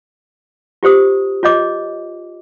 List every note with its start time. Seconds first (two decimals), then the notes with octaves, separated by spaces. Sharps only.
0.83 F4 G4 C5 D#6
1.43 F4 C#5 D#5 D6